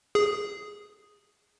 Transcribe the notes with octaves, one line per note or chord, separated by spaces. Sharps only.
G#4